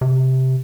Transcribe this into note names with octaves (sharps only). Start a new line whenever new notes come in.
C3